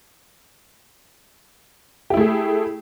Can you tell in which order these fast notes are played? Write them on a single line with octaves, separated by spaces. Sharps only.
G4 E4 A3 G#4